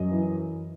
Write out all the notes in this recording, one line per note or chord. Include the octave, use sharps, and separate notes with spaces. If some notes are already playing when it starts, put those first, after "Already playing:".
Already playing: F#2 D#5
E3